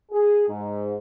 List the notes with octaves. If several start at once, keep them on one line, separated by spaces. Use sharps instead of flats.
G#4
G#2